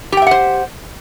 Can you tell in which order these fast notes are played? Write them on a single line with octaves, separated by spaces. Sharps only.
G4 G5 E5 F#5 C5